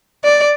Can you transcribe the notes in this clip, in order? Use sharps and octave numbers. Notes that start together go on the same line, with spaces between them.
D5